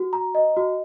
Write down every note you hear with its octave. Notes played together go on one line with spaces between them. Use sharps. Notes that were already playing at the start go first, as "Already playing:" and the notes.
Already playing: F#4
A#5
D#5
F#4